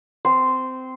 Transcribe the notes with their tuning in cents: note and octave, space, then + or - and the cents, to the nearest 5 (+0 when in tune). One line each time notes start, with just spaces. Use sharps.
C4 -15 C6 -10